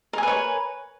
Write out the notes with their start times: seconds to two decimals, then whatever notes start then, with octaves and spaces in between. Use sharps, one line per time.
0.13 A#4
0.18 G#5
0.23 B4
0.28 C#5